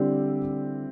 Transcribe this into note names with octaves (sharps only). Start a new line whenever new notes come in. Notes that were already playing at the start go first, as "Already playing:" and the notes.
Already playing: D3 G3 C4 E4 G4